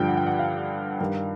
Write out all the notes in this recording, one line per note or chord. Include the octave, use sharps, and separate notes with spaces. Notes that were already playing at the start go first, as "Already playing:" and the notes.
Already playing: G2 D3 F3 G5
F#5
G5
F#5
F5
G2 D#3